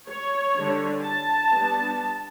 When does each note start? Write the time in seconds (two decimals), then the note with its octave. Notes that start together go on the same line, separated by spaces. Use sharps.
0.09 C#5
0.56 D3 G3 D4
1.04 A5
1.52 G3 B3 D4